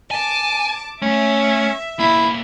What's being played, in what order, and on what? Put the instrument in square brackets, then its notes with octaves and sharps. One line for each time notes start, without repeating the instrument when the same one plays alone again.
[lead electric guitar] G#5 [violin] A5 D6
[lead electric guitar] A3 [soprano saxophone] C#4 [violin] E5
[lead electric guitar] B1 A#3 [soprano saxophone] E4